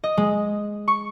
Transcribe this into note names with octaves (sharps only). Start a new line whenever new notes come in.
D#5
G#3
C#6